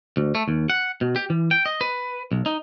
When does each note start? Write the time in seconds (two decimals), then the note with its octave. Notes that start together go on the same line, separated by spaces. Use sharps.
0.17 D2
0.35 A3
0.48 D#2
0.70 F#5
1.01 B2
1.16 G4
1.30 E3
1.51 G5
1.66 D#5
1.81 B4
2.32 B1
2.46 D#4